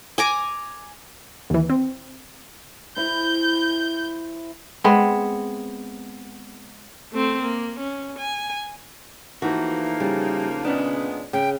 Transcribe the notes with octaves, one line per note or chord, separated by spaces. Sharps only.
G#5 A#5 D6
D#2 E3
C4
E4 C5 G6
G#3 B3 C4
A3 C4
A#3
C#4
G#5
E3 F3 A3 A#3 D#4 F#4
C#3 G3
A#2 G#3 B3 C#4 D4
C#3 G5